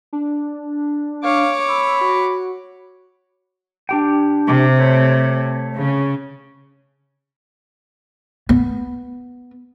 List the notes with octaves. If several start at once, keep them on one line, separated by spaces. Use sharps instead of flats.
D4
C#5 F5 D6
B5 E6
F#4
D4 G4 G5
C3
A3 C#5
C#3
B3